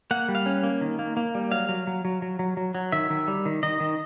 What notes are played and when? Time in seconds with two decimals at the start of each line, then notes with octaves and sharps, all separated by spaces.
0.11 A#3 F#5
0.29 G3
0.35 F5
0.46 C#4
0.63 A#3
0.81 D#3
0.99 A#3
1.17 A#3
1.35 G3
1.51 F#3 F5
1.69 F#3
1.87 F#3
2.05 F#3
2.22 F#3
2.39 F#3
2.57 F#3
2.75 F#3
2.92 D#3 E5
3.10 D#3
3.28 G3
3.46 D#3
3.63 D#3 D#5
3.80 D#3